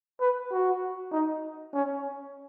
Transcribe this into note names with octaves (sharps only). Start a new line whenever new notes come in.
B4
F#4
D#4
C#4